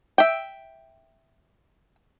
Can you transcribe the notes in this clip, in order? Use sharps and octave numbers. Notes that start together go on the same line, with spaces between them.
E5 G5